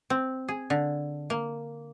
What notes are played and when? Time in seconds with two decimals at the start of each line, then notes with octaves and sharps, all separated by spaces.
0.10 C4
0.49 G#4
0.70 D3
1.30 A#3